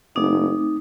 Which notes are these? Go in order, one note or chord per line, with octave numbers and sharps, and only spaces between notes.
F#1 A3 C4 D#4 D6